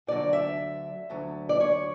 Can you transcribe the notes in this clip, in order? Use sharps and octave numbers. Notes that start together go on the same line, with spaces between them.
D2 D3 F#3 D5
E5
D2 D3 F#3
D5
C#5